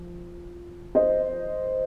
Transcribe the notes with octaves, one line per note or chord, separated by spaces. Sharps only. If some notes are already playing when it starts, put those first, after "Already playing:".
Already playing: F3
C5 D#5